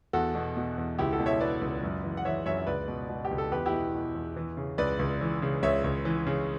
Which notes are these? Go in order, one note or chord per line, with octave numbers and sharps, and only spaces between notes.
E2 F#4 A4
B2
B2
E2
C#2 E4 G4
F#4 A4
B2
C#5 E5
B2 B4 D5
C#2
F#2
E3
F#5
E3 C#5 E5
F#2 C#5 E5
E5
C#2 B4 D5
B2
B2
G4
C#2
A4
E2 G4 B4
E4 G4
B2
B2
E2
E3
C#3
C#2 B4 D5
C#2
E3
C#3
C#2 C#5 E5
C#2
E3
C#3